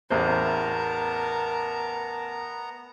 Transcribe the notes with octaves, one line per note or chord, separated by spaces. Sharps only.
A1 E2 B3 A#4 C5 A5 A#5